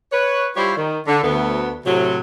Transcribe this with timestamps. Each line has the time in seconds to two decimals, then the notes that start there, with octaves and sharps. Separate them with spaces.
0.12 B4 C#5
0.56 G3 E4 F4 G4 C5 C#5
0.76 D#3
1.06 D3
1.23 D2 B3
1.85 A2 C3 F#3